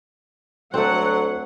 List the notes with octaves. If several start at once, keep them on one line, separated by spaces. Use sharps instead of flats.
D2 F#3 A3 C4 F#5